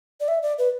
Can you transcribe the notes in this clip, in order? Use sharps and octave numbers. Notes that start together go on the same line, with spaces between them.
D5
E5
D5
B4